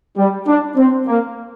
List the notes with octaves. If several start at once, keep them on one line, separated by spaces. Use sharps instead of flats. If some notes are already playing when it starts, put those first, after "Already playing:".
G3
D4
C4
A#3